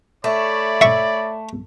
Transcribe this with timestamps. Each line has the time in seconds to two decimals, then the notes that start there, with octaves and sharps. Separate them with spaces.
0.24 A3 C#5 D5 B5
0.81 E5 C#6